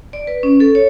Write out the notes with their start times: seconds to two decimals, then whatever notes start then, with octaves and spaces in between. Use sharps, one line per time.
0.13 D5
0.27 B4
0.43 C#4
0.60 A4
0.75 C#5